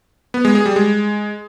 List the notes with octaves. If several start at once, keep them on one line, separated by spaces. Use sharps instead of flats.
B3
G#3
G#4
G3
G#3